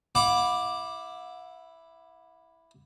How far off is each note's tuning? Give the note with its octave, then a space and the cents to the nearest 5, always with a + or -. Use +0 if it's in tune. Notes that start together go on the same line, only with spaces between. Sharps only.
E4 +0 F#5 -40 D6 +0